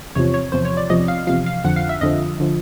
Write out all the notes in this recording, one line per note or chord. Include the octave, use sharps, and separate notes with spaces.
E2 C3 F3 C#5
C#5
E2 C3 F3 C5
C#5
D5
E2 C3 F3 D#5
F5
E2 C3 F3 F5
F5
F2 D3 F3 F#5
F5
E5
F2 D3 F3 D#5
D3 F3